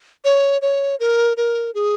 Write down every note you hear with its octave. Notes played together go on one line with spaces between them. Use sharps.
C#5
C#5
A#4
A#4
G#4